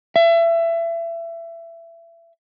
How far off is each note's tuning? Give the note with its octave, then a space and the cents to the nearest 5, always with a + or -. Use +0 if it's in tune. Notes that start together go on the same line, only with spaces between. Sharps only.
E5 +25